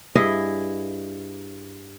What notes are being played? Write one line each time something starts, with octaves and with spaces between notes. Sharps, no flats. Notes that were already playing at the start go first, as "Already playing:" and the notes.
G2 E4 G#4 D#5